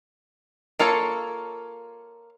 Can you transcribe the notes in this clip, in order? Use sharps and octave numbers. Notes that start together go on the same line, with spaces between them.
A#3 F4 A4 C#5